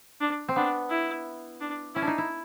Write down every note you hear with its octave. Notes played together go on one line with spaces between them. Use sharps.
D4
C4
B3 D4
E4
D4
C#4 E4
D4
D#4
E4